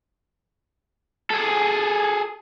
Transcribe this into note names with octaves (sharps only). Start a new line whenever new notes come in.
G#4 A4